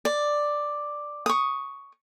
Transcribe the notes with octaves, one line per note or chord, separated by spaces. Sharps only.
D5
C#6 D#6